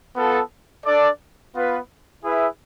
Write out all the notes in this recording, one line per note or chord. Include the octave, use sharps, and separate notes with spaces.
B3 F4 A4
D4 A4 D5
B3 F4 B4
E4 G#4 B4 E5